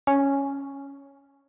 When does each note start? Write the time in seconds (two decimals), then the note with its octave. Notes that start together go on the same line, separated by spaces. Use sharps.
0.07 C#4